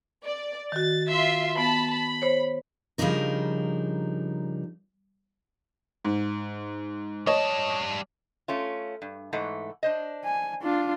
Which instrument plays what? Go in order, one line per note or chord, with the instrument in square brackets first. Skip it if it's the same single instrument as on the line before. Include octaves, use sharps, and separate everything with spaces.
[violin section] D5
[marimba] D#3 F#4 [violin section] A6
[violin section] F4 E5 C6
[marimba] B3 [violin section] A5 B5
[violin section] B5
[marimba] C5 C#5
[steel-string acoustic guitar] C#3 F3 G3 D4 D#4 A#4
[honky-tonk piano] G#2
[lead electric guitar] G3 A5 [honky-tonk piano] C#5 D#5
[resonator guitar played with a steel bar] A3 C#4 F4
G2
G#2 E3 A3
D4 C5 D#5
[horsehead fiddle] G#5
D4 F4